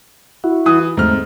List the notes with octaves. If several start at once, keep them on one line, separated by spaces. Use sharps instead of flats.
E4 F#4
E3 D#6
G#2 A3 C4 F6